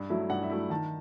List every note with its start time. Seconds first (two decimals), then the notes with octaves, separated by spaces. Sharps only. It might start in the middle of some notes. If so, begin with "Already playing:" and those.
Already playing: G2
0.10 F#3 A3 E4
0.30 G2 F#5
0.43 E5
0.50 F#3 A3 E4
0.70 D#3 A5